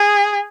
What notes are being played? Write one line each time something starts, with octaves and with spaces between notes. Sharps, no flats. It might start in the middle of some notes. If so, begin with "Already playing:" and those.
Already playing: G#4